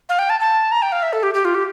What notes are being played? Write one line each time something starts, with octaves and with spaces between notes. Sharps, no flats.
F5
G5
A5
A5
A#5
G5
F5
E5
A4
G4
G4
F4
G4